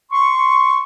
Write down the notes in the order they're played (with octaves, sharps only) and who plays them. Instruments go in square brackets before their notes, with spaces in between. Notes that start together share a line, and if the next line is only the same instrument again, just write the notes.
[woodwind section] C6 C#6